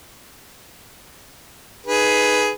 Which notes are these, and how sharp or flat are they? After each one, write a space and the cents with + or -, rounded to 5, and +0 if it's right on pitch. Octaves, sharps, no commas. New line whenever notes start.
D#4 +0 G#4 +10 B4 +0